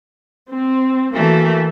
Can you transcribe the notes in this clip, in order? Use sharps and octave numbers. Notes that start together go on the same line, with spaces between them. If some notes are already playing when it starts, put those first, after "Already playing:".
C4
E3 A3 A#3 F#4 E5